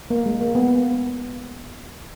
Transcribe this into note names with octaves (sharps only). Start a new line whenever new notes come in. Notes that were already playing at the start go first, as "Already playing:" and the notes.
A#3
G#3
A#3
B3